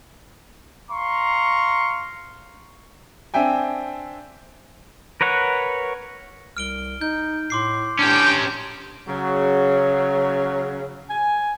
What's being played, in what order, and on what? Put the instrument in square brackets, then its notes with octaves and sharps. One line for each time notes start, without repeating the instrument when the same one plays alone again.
[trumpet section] F5 A#5 C6 C#6
[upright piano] C4 D4 E5 G5 G#5
[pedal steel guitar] A#4 B4 C#5 F#5
[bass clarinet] C2 [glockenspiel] F6 D7 G7
[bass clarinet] D#4 [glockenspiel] G6
[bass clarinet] A2 [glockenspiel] C6 D6 C7
[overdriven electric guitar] C#4 G4 [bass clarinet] D4 [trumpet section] G5
[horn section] C#3 F#3
G#5